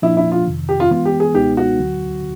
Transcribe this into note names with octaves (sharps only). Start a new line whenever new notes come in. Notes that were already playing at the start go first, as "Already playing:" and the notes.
A#2 F3 A#3 D4 E4
E4
F4
F2 C3 D#3
G4
F4
E3 G#3 B3 F4
G4
G#4
C#2 B2 G#3 B3 D#4 G4
F#4
D2 D3 F#3